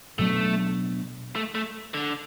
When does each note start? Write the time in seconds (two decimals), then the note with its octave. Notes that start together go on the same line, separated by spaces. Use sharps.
0.19 B2 F#3 A3 B3 D4
1.36 A3
1.55 A3
1.94 D3